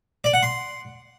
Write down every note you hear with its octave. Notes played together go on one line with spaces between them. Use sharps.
D5
F#5
C6